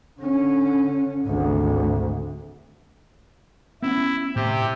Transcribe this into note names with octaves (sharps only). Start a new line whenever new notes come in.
D3 C#4
G#1 D2
B3 C#4 E4
A2 C3 G4